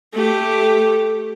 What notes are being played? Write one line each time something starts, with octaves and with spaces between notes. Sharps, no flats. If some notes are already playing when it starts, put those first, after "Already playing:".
A3 G4